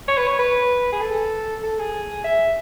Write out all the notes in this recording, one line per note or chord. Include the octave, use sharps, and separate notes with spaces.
C#5
B4
C#5
B4
G#4
A4
A4
G#4
E5